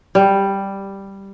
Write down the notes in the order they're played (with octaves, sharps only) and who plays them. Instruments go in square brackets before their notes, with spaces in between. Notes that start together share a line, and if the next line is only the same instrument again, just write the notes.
[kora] G3